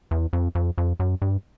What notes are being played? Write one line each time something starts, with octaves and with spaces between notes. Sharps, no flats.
E2
F2
F2
F2
F#2
G2